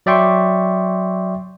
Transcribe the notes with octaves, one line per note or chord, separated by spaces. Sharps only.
F#3 D5 E5 G5 C6 C#6